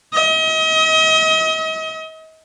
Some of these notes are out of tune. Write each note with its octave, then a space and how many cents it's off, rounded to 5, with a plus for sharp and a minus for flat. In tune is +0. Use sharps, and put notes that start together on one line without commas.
D#5 +40